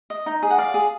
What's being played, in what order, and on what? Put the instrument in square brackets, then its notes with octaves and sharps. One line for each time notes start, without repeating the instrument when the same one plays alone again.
[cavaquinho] D#5
D#4
G#4
F#5
D5 F5
G#4